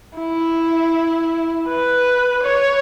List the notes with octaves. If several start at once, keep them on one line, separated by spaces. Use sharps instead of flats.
E4
B4
C#5